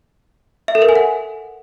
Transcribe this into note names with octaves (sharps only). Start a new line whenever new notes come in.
E5
A4
A#4
G#5
F#5